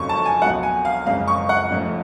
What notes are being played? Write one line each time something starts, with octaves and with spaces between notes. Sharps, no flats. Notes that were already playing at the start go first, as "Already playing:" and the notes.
Already playing: F1 F2 C#3 F#3 C#6
A5
G#5
C#2 B2 F#3 F#5
G#5
F5
F#1 F2 C#3 G#3 F5
C#6
F#5
F1 F2 C#3 F3 A3